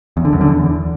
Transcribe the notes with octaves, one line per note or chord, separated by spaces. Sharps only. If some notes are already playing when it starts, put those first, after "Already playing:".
E2
D3
F#2
D3
E2